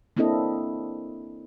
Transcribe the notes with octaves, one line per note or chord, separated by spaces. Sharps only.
A#3 C4 D4 E4 A4 D#5